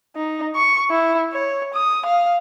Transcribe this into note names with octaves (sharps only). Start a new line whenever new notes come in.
D#4
C#6
E4
C#5
D#6
F5